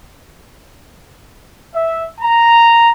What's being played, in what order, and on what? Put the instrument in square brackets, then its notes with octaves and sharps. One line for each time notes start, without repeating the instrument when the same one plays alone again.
[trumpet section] E5
A#5